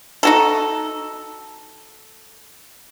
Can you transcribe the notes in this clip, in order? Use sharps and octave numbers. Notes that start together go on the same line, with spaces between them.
D#4 F#4 A4